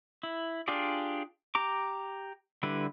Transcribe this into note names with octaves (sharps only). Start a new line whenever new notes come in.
E4
D4 F4 G4 G#4 D5
G4 A#5 D6
D3 G3 E4 B4